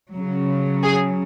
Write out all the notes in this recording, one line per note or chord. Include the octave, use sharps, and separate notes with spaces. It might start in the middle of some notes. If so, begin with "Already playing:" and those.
C#3 F#3
G#4